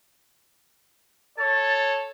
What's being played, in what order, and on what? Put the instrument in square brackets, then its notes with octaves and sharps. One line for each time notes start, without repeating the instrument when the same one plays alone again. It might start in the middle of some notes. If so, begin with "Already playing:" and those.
[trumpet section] A4 C#5 [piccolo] A6